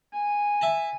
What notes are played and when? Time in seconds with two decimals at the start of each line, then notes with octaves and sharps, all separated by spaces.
0.13 G#5
0.61 E5 A5